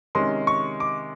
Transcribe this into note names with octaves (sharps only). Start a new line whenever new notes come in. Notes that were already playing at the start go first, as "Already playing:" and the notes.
C3 D#3 G#3 C#4 C6
C#6
D6